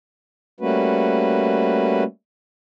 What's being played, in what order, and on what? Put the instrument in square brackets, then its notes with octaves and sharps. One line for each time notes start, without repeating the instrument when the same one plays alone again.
[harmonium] G3 A3 A#3 C#4 F#4 B4